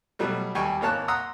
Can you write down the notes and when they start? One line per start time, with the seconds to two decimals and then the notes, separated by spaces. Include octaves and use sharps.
0.19 B2 F#3 G3 A3
0.55 D#2 G3 G4 G#5 C#6
0.81 G#1 A#3 C#5 A5 F#6
1.08 F#5 A#5 C6 D#6 E6